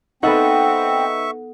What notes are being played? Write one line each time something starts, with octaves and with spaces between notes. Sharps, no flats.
B3 C4 D#4 A4 B4 E5 F#5 C#6